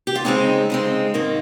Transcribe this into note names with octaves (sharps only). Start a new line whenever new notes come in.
G4
F4
C#3 G#3 C4 D#4
C#3 G#3 C4
G#2 D#3 A#3